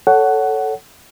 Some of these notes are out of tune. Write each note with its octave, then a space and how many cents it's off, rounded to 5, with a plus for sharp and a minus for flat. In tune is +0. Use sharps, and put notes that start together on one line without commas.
A4 +0 C#5 +15 F#5 +10